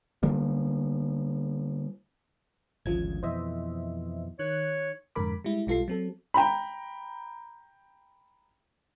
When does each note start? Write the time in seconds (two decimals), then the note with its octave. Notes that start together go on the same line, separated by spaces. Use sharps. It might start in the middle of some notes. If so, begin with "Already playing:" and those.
0.23 D3 G3 A#3
2.86 G#1 D2 C#3 F3 G#6
3.23 F2 B2 E3 C5 D#5 E5
4.39 D#3 C#5 F#6
5.15 F2 G#2 D3 A#4 B5 D6
5.44 G3 G#3 E4
5.67 B1 G3 F4 A4 C7
5.88 F#3 C4 A4
6.34 G5 A#5 B5